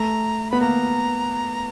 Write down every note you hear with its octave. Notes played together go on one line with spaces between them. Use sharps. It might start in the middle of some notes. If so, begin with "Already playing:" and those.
Already playing: A3 A#5
B3 B5
A#3 A#5